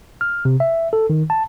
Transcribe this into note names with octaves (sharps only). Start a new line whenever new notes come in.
F6
C3
E5
A4
D#3
A5